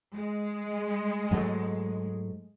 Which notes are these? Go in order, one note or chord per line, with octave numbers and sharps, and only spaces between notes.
G#3
G#2 F#3 A3